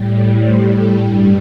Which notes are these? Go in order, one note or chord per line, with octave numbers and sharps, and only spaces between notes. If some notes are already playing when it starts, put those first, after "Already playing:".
Already playing: A2 G3
C5
A4
G2 G3